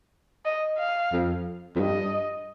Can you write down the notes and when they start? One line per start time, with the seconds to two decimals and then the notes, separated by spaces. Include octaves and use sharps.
0.45 D#5
0.78 F5
1.12 F2
1.76 F2
1.80 G2 D#5